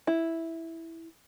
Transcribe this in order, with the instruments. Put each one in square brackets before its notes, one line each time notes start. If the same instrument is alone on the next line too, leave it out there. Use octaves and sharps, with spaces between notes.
[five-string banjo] E4